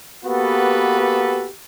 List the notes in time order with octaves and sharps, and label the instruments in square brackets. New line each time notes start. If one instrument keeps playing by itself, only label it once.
[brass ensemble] A#3 B3 F#4 G4 A4 B4